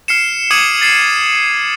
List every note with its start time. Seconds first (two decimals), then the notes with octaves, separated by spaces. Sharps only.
0.08 F6 C7 C#7 E7
0.51 D6 D#6 G#6 C#7 D#7 F#7
0.82 A6 C7 E7